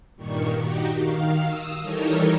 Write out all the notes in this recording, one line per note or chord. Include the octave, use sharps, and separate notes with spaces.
G2 A#2 D#3 C#6
D#4 F#4 G4
D#3 F5
D#6 E6
E3 G3 D#4 A4 A#4 C#5